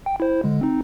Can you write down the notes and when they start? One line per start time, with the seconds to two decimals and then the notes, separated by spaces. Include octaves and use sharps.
0.06 G5
0.20 E4 C5
0.44 D3 G#3
0.61 C4 D#4